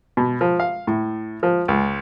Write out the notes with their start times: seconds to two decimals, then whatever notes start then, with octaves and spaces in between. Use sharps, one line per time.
0.17 B2
0.41 F3
0.60 F5
0.87 A2
1.43 F3
1.68 C#2